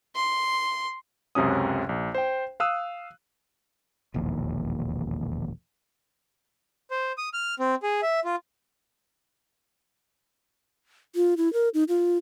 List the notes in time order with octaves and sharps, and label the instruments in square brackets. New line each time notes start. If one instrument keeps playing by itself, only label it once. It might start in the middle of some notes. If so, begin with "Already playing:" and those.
[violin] C6
[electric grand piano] C#2 F#2 C3 F#3 C#4 D#6
A#1
C5 G5
F5 D#6 E6 F#6 D#7
[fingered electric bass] E1 A#1 D#2
[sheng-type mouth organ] C5
D#6
F6
C4
G#4
E5
F4
[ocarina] F4
E4
A#4
D#4
F4